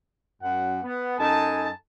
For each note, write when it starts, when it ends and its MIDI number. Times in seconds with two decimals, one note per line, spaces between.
0.43 0.78 42
0.43 0.78 78
0.83 1.17 59
1.19 1.69 42
1.19 1.69 63
1.19 1.69 69
1.19 1.69 80
1.19 1.69 81